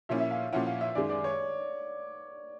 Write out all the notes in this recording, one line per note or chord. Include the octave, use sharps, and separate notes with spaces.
A#2 F3 A#3 C#4 E4 E5
E5
F5
A#2 F3 A#3 C#4 E4 F#5
F5
E5
F#2 D#3 G#3 D5
D5
C#5